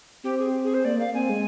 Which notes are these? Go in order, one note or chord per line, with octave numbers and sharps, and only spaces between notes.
C4 G4
G#4
G#4
C5
A#3 D5
A#3
F5
C4 G#5
G#3